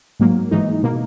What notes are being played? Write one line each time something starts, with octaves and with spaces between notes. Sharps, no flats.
G#2 F#3 A#3
G#2 E3 G#3 D#4
B2 A#3